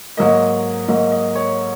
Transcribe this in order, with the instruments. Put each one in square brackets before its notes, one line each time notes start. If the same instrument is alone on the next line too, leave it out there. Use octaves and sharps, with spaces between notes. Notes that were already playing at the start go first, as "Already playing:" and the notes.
[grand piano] G#2 F#3 A#3 D#5
G#2 F#3 A#3 D#5
D#5
C#5